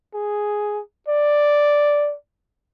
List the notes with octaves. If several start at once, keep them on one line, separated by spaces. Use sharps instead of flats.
G#4
D5